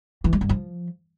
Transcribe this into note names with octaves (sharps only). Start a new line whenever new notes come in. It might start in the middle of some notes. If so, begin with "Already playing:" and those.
E3
G#3
G2
F3